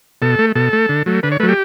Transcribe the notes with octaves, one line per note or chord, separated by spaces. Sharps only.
B2 A4
A3
B2 A4
A3
D3
F#3 A3
D3 B4
C#5
F#3 A3 B4
G4